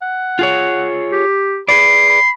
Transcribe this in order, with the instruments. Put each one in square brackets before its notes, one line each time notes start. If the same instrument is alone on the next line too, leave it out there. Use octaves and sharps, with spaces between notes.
[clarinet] F#5
[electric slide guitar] F4 G#4 C#5
[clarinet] G4
[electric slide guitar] G#4 B4 D5 [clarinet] B5 [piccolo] C7
[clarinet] B5